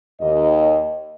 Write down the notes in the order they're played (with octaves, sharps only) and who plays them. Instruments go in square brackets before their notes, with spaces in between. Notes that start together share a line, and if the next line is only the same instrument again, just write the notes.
[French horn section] D#2 D#5